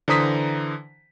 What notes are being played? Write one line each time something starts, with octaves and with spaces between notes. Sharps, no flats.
D3 E3 C5 A#5 D#6 B6